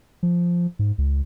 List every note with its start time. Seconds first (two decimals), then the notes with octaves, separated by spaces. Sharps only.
0.23 F3
0.79 G#2
0.98 C#2